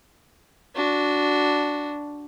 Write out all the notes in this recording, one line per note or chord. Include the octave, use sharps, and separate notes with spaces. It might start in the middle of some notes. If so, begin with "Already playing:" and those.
D4 F#4